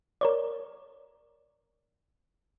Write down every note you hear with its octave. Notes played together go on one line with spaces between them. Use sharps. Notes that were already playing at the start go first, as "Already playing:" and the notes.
A#4 C#5 D5